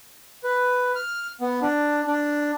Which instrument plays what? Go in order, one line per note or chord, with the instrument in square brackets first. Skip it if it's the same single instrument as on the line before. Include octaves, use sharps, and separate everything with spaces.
[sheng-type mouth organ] B4
F6
B3
D4
D4